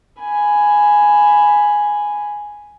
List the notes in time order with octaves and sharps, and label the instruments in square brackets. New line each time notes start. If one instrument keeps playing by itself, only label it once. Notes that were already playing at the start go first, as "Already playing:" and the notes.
[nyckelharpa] G#5 B5